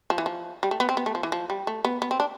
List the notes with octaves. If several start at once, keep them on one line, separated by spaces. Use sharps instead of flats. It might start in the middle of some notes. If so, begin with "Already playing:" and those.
F3
E3
F3
G3
A3
B3
C4
B3
A3
F3
E3
F3
G3
A3
B3
B3
C4
D4